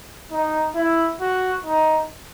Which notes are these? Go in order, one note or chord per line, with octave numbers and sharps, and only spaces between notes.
D#4
E4
F#4
D#4